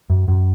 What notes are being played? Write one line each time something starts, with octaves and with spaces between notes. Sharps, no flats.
F#2
F#2